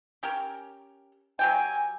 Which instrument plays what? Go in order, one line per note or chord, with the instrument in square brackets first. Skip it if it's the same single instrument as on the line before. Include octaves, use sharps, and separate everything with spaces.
[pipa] C#4 G4 A#4
[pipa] F#3 G4 G5 [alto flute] G#5